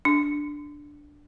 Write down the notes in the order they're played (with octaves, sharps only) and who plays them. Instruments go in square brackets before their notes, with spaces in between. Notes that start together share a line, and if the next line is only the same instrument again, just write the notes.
[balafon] D4